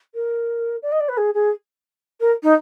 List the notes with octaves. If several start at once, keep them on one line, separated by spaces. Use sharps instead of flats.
A#4
D5
D#5
D5
B4
G#4
G#4
A#4
D#4